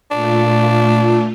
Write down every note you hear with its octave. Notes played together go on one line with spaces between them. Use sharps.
A#2 A3 D4 F4